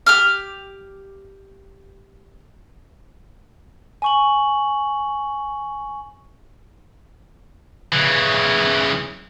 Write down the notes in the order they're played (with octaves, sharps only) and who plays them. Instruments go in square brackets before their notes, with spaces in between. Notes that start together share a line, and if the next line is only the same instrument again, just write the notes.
[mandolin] G4 D6 F6
[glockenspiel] G#5 C#6 F#7
[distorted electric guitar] C#3 E3